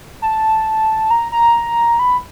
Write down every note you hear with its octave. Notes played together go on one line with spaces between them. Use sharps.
A5
A#5
A#5
B5